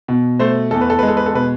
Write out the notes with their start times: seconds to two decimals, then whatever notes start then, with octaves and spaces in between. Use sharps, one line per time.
0.08 B2
0.39 A3 C5
0.71 E2 A4
0.81 B4
0.90 A4
0.99 G#3 B4
1.08 A4
1.17 B4
1.26 A4
1.34 B2 B4